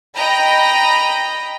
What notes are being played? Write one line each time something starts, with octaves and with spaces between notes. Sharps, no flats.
D#5 G5 A#5 B5